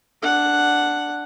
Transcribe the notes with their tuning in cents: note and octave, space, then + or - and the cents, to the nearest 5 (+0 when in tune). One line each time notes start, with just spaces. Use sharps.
D4 +0 F#5 +0